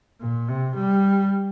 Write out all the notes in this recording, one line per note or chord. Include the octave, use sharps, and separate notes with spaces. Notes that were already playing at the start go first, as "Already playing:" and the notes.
A#2
C3
G3